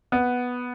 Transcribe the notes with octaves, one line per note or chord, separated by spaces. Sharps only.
B3